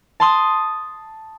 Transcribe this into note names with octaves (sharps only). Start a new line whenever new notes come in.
A5 C6 D#6